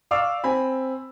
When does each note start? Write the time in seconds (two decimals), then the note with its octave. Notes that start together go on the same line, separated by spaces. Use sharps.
0.11 D5 F5 C#6 D6 E6
0.44 C4 G#5 B5